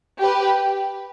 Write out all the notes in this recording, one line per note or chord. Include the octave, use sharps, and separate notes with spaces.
G4 B4